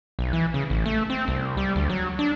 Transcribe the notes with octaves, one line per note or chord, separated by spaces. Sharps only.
B1
E3
C#3
A1
A3
C4
C2
G3
D2
F#3
D4